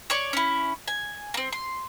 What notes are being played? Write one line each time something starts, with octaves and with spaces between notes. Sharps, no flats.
C#5 D5 C#6
C#4 E4
G#5
A#3 C4
C6